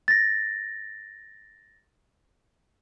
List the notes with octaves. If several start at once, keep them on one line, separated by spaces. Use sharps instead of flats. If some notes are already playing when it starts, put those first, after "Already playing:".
A6 A#6